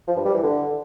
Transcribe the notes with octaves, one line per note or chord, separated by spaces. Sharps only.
F3
G2
G3
E3
D3